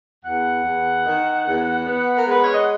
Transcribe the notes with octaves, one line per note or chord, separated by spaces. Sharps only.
E2 F#5
E2
D#3
E2
B3
A#4
G#3 B4
C#5
D#5